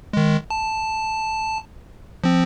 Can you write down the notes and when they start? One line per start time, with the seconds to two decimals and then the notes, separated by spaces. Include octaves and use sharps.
0.13 D#3 G#3
0.50 A5
2.24 F3 C4